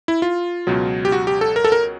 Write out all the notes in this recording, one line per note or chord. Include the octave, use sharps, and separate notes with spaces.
E4
F4
C#2 B2 F#3
G4
F#4
G4
A4
A#4
A4
A#4